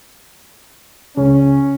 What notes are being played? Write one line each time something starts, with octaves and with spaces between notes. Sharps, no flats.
C#2 C#3 C#4